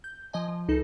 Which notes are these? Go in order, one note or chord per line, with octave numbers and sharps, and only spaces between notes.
G6
F3 D#5 G#5
F3
C#2 D#4 A4